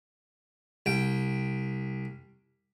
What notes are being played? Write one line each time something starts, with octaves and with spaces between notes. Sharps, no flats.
C2 G5